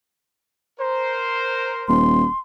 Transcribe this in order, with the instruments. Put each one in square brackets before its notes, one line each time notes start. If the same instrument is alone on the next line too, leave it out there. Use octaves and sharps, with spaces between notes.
[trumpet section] A#4 C5
[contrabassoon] D#1 [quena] C6